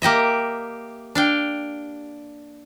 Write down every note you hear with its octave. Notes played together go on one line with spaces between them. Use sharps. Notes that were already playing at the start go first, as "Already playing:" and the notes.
A#3 G4 D#5 E5
D4 F5 G5